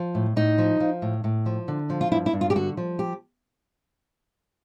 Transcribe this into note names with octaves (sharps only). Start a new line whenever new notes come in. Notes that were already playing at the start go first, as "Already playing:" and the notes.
Already playing: F3
A2
A2 D#4
F3
F3
A2
A2
F3
D3
F3
F4
G2 E4
E4
G2
F4
G4
D3 F#4
F3
G4